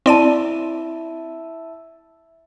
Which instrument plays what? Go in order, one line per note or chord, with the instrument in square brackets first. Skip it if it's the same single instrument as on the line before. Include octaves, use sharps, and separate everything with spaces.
[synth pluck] C4 D5 D#7 [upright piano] E4 A5